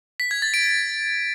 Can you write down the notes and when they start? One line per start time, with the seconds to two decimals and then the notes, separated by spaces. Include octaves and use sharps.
0.20 B6
0.31 G#6
0.42 A6
0.54 D7